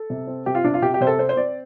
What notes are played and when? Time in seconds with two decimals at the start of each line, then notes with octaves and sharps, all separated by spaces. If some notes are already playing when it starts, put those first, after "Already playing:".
Already playing: A4
0.10 C3
0.27 C4
0.46 C3 G4
0.55 F4
0.64 C3 D4
0.74 F4
0.82 C3 G4
0.94 G4
1.01 C3 C5
1.07 A4
1.19 C4 C5
1.29 C5
1.37 C4 D5